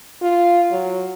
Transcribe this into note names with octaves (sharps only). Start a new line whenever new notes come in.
F4
F#3